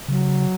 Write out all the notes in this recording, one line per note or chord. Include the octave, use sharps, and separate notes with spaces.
C#3 F#3